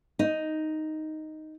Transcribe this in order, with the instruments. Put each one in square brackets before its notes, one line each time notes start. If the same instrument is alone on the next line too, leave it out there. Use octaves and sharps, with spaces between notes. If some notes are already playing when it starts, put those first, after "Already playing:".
[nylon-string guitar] D#4